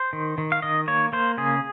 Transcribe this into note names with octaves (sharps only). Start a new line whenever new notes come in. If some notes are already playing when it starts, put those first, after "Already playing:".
Already playing: C5
D#3
D#3
F5
D#3 D#5
A#3 C#5
A#3 C5
C#3 G#4